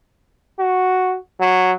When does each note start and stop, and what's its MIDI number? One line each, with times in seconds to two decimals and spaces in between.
0.59 1.16 66
1.40 1.72 54